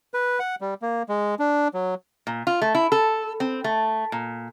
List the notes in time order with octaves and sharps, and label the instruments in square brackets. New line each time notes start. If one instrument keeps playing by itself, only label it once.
[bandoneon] B4
F#5
G3
A#3
G#3
D4
F#3
[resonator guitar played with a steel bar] A#2
F4
A3
E4
A4
C4
A3
A#2